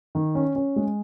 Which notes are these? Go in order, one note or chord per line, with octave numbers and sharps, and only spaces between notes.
D#3
C#4
C#4
G#3